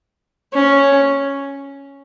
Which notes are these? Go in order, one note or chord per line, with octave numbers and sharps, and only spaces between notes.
C#4